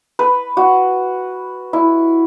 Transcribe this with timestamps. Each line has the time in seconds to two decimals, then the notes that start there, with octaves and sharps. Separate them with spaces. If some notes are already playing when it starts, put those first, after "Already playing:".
0.19 B4
0.57 F#4
1.73 E4